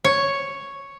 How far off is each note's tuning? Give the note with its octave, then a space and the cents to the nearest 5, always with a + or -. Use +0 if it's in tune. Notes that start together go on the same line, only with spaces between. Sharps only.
C#5 +0